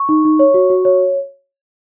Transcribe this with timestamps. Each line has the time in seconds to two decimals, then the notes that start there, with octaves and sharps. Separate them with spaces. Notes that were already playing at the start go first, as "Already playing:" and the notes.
Already playing: C#6
0.09 D#4
0.25 D#4
0.39 C#5
0.54 F#4
0.70 F#4
0.85 C#5